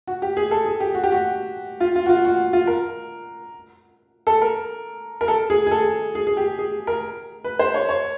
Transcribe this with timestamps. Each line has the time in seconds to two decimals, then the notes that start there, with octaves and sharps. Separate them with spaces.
0.07 F#4
0.22 G4
0.37 G#4
0.51 A4
0.66 G#4
0.80 G4
0.95 F#4
1.04 G4
1.12 F#4
1.80 F4
1.96 F4
2.06 F#4
2.09 F4
2.25 F#4
2.53 F4
2.67 A#4
4.27 A4
4.42 A#4
5.21 A#4
5.28 A4
5.50 G#4
5.67 G#4
5.71 A4
6.15 G#4
6.27 G#4
6.37 G4
6.59 G#4
6.87 A#4
7.44 B4
7.59 C5
7.74 C#5
7.89 C#5